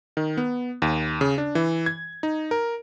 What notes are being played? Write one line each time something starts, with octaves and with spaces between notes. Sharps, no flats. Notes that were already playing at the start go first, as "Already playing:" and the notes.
D#3
B3
D#2
C#3
D4
E3
G#6
D#4
A#4